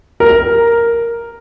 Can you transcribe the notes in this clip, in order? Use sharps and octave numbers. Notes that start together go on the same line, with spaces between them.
A#4